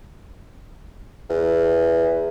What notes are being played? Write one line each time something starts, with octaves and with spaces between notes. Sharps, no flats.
E2